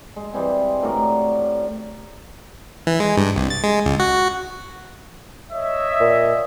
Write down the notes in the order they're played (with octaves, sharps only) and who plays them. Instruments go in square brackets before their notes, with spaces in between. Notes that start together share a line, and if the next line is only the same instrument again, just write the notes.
[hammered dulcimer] G#3
E3 G3 G#3 C4
A2 F#4 A#4 D5
[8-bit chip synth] E3
G#3
G2
C2
A6
G#3
C#2
F#4
[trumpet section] C#5 D#5 E5
[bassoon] A#2